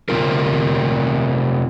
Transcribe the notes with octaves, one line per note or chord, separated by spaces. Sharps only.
C3 E3 C4 F4 A#4